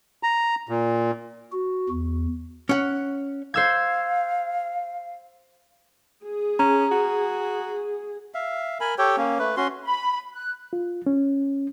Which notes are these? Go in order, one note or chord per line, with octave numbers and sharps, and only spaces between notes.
A#5
A#2
F#4
E2
C#4 F#5
C5 F5 E6 G#6
G#4
C#4 A#5
F#4
E5 F5
A#4 G#5 B5
G4 A4 C#5 G5
A#3 C#4
A3 B4
C#4 F#4 C6
B5
F#6
F4
C#4